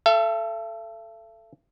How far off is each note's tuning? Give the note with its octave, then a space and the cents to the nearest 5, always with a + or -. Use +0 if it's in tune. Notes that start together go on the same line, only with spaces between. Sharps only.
A4 +0 E5 +45